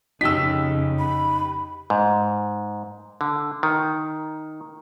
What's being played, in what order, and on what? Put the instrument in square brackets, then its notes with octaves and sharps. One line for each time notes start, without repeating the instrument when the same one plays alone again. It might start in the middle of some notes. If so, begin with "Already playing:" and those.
[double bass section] F2 C#3 [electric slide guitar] D#4 G4 [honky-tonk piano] E6 B6
[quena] B5
[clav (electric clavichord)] G#2
D3
D#3